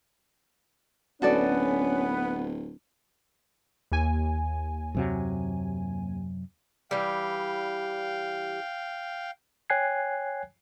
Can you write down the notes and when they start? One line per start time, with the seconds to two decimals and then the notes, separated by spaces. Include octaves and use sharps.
1.22 D1 B3 C#4 F#4 A4 B4 D5
3.92 D#2 G#5
4.95 F#2 C3 F#3
6.91 E3 G3 F5 G5
9.70 C#5 G5 G#5 F#6 G#6 C7